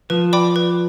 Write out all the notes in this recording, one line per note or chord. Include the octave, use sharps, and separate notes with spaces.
F3 B4
D5 G5 B5 D6
B4